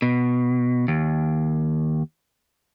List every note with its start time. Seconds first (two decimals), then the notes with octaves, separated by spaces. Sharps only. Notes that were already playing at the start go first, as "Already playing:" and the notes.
0.02 B2
0.88 D#2